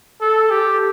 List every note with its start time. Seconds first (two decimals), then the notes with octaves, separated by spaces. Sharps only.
0.21 A4
0.50 G4